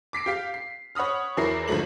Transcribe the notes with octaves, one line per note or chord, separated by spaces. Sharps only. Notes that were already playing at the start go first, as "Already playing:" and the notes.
D6 B6 C7 D7
G4 F5 B6
C7
C#5 F#5 B5 D#6 F6
E2 F#3 E4 A#4 C7
G#1 D3 F3 F#3 A3 F#7